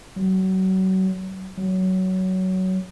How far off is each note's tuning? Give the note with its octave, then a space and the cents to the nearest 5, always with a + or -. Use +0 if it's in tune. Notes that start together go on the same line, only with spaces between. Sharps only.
F#3 +30
F#3 +15